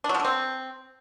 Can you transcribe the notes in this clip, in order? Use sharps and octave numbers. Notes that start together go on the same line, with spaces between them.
D4
F#3
F3
D3
C4